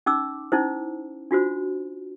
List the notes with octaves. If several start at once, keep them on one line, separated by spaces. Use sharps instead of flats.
C#4 D#4 D6 E6
C#4 D#4 E4 C5
D4 F4 F#4 C5